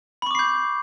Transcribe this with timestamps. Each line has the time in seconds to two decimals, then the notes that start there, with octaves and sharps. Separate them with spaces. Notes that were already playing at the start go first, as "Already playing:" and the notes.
0.22 B5
0.26 C#6
0.31 D6
0.35 C7
0.39 G6